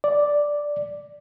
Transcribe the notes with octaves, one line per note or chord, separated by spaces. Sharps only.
D5